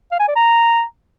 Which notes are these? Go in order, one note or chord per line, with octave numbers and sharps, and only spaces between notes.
F5
G#5
D5
A#5